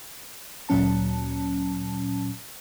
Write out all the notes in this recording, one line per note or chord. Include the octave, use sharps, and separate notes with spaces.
D2 A#2 F#3 C#4 A5